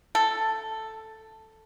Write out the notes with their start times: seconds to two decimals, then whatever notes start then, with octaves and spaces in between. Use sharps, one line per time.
0.15 A4